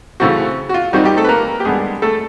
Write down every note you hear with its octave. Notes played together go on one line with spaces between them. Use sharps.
C#3 E3 A3 C4 F#4
F#4
F4
D#3 G3 C4 D#4 F#4
G3 G4
A3 A4
B4
A#3 A#4
G4
D3 G3 G#3 B3 G#4
A3 A4